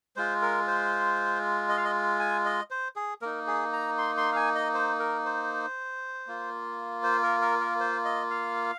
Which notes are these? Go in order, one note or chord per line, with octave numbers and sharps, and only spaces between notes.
G#3 F4 C5
A#4
C5
D#5
F5
D#5
G#5
D#5
C5
G#4
A#3 D#4 A#4
G#4
A#5
C6
C6
F5
G#5
D#5
C5
A#4
C5
A#3 F4
C5
A#4
A#4
A#4
C5
D#5
F5